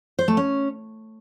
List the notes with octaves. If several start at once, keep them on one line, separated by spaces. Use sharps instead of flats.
C5
A3
C#4